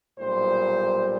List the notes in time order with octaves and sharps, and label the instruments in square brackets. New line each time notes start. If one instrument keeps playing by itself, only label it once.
[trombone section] B1 A#2 G3 C5